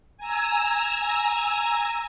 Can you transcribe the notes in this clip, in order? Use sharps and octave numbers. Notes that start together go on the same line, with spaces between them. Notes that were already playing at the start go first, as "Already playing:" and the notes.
G#5 A#5 E6